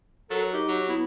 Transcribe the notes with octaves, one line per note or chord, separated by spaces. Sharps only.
F#3 A4 A#4
D#4 G4
F#3
B3 E4